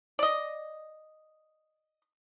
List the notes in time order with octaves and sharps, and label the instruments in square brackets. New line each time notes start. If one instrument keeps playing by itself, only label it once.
[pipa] D5 D#5